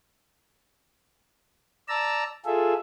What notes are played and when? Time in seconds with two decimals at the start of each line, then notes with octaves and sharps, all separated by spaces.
1.88 D5 A5 A#5 E6
2.45 F4 G#4 A4 E5